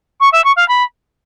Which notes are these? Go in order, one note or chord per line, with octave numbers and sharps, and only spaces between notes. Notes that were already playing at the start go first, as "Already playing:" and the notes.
C#6
E5
C#6
F5
B5